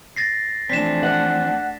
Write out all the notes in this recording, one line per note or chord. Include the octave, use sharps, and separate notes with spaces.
A6 A#6 C7
E3 F3 A3 C4 D4 B6 E7
F#5